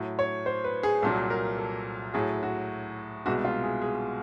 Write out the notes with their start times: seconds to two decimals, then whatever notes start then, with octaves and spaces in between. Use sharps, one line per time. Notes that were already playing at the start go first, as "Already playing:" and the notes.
Already playing: A2 F#3
0.19 C#5
0.46 C5
0.64 B4
0.83 G#4
1.02 C2 A#2 F#3 A4
1.30 A#4
1.58 A4
2.14 A2 F#3 G#4
2.43 F#4
3.26 C2 B2 G#3 F#4
3.45 F4
3.63 G#4
3.82 G#4